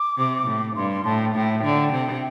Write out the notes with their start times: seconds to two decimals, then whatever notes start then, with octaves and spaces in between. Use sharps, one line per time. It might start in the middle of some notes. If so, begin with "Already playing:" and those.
Already playing: D6
0.18 C3
0.47 A2
0.76 G2 C6
0.91 C6
1.05 A2 A5
1.20 G5
1.35 A2 G5
1.64 D3
1.93 C3